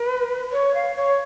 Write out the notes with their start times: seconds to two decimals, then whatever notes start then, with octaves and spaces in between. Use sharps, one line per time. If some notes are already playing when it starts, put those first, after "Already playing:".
Already playing: B4
0.52 C#5
0.74 F5
0.96 C#5